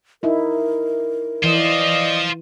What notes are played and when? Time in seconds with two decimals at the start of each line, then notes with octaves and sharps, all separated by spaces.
0.23 D#4 E4 A#4
1.44 E3 F4 C5 D5 D#5